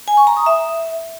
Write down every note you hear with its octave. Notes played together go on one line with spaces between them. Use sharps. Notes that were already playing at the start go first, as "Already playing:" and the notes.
G#5
C#6
A#5
D#6
E5